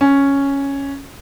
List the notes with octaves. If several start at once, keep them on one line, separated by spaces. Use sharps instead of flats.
C#4